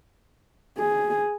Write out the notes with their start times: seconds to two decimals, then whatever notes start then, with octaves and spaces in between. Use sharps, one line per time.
0.78 G#4